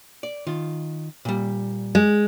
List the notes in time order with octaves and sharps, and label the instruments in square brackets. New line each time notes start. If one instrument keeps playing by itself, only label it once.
[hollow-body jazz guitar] D5
D#3 F4
A#2 G3
[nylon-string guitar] G#3